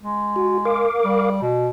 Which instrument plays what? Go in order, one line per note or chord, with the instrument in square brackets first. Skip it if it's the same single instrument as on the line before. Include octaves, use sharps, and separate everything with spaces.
[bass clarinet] G#3
[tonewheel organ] F#4
A#4 F5 D6
[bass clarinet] G3
B2